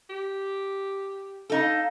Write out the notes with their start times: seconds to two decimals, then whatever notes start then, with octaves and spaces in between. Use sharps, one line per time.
0.10 G4
1.50 D#4 A4 F5